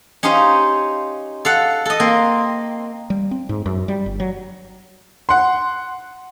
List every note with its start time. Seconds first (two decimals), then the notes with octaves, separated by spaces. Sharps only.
0.23 C#4 D#4 G4 C5 F5
1.45 A4 F5 F#5
1.85 A4 D#5
2.00 A#3 C4
3.10 G3
3.31 C4
3.49 G#2
3.66 F#2
3.88 G3
4.06 G1
4.20 F#3
5.29 F#5 C6